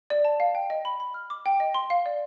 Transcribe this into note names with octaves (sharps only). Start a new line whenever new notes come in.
D5
A5
F5
G5
D#5
B5
B5
F6
D6
G5
D#5
C6
F5
D5